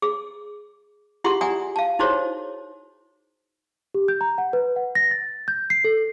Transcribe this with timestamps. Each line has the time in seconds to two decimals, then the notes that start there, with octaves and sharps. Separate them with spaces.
0.02 G#4
1.24 E4 F4 G4 G#4 F#5 C6
1.41 D5 E5 F#5 G#5 A#5 D#6
1.76 F5 A5
1.99 D#4 E4 F#4 G#4 C5 C#5
3.94 G4
4.08 G6
4.21 A#5
4.38 F#5
4.53 B4
4.76 F#5
4.95 A#6
5.11 A6
5.48 G6
5.70 C7
5.84 A4